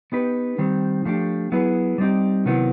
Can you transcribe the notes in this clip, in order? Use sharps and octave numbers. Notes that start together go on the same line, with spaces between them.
B3 D#4 G4 B4
D#3 G3 C4
F3 A3 D4 G4
F#3 B3 E4 G#4 B4
G3 C4 D#4 G4
C3 D#3 F#3 B3 E4